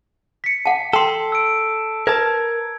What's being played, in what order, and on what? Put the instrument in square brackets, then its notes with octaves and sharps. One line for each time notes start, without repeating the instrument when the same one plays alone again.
[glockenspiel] B6 C#7
[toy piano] F#5 A5
[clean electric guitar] A4 [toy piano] G5 C6 [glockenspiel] A5 C7
[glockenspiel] E6 D7
[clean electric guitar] A#4 A5 [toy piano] B4 [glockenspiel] G#6